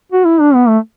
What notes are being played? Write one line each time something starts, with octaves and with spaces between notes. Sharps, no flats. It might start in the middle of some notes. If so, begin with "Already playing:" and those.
F#4
E4
D4
B3
A3